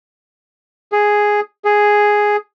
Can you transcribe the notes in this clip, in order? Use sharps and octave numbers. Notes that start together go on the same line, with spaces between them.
G#4
G#4